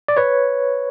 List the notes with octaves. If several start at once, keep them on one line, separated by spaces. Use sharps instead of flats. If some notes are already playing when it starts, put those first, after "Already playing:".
D5
B4 C#5